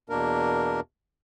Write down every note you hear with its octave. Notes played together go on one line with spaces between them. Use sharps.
E2 B2 A#3 D4 A#4